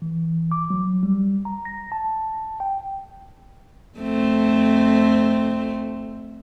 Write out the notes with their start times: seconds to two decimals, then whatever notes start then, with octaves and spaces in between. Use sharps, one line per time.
0.02 E3
0.52 D6
0.70 F#3
1.03 G3
1.45 A#5
1.65 A#6
1.92 A5
2.60 G5
3.98 F2 A3 C4